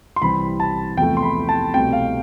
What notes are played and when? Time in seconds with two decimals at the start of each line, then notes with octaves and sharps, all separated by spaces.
0.16 C6
0.22 C2 C3 E3 G3 C4 B5
0.60 A5
0.97 E2 C3 F3 A3 G5
1.17 C6
1.23 B5
1.49 A5
1.74 C2 B2 A3 C4 G5
1.93 F5